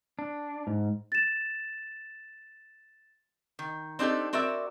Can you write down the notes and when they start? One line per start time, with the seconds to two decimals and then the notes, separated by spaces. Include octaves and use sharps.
0.19 D4
0.67 G#2
1.12 A6 E7
3.59 D#3
3.99 C4 D4 D#4 G4 A4
4.33 C4 F#4 A#4 D5 E5